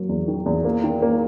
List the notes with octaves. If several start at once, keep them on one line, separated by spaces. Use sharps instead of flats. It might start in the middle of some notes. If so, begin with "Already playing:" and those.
Already playing: F#3 A#3
E2
D#3
E2
A#3
D#3
A#3